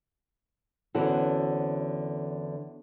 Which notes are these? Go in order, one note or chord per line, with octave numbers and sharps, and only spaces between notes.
E2 D3 C4 C#4 F#4 A4